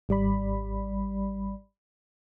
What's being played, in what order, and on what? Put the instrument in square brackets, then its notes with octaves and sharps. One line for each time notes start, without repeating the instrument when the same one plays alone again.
[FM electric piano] G#1 G3 D5 B5